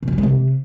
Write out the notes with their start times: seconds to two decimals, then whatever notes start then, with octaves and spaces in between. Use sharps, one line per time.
0.03 B2
0.08 F#2
0.13 G3
0.18 G#3
0.23 C3